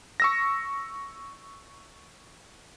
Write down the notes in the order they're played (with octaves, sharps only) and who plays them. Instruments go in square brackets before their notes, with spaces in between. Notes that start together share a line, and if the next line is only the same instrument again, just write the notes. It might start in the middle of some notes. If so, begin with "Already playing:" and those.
[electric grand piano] C#6 E6 A#6